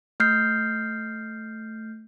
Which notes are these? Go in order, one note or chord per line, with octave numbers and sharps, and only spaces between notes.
A3 F6 G6 C7